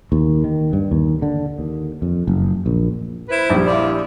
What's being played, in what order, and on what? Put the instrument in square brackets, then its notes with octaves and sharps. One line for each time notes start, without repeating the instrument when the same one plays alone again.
[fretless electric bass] D#2
D#3
G2
D#2
D3
D#2
F2
F#1
A#1
[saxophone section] E4 B4 C5
[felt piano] A#1 G3
[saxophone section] F3 D4 E4